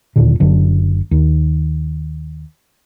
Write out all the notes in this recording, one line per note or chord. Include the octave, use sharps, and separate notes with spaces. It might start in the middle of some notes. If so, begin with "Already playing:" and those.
D1 D#2 A#2 D3
F#1 F#2 D3
D#2